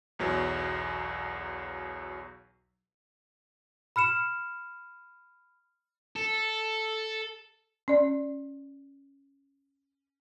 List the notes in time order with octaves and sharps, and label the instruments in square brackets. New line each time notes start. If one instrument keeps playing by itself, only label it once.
[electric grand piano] B1 E2 F#3
[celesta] B5 F6 C#7 E7
[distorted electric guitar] A4
[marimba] C#4 D5